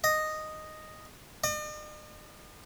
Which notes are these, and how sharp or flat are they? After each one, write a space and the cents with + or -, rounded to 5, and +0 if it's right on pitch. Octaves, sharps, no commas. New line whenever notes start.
D#5 -5
D#5 -45